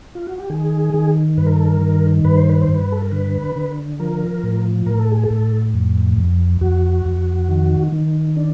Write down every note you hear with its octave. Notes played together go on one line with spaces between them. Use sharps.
F4
F#4
G4
D#3 G#4
D#3
G2 B4
A#4
A4
A#4
D#3
G2 B4
C5
B4
C5
G2
B4
A4
A#4
D3 B4
D3
F3 A#4
A2
A2 A#4
A4
G#4
A4
A2
F2
F2
F2 F#4
F2
D#3
D#3
D4